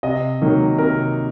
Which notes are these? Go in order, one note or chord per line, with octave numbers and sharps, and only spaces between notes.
C3 D#5
D#3 F#3 A#3
C3 A#4